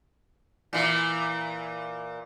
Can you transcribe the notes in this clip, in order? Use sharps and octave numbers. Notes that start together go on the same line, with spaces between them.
A#2 E3